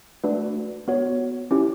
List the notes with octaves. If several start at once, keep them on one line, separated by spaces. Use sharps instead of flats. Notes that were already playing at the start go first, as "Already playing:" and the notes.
A3 D4 F#4 B4 D5
B3 F#4 C#5
C#4 E4 G4